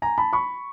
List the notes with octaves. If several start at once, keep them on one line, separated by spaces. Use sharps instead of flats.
G#5 A#5
A5 B5
B5 C#6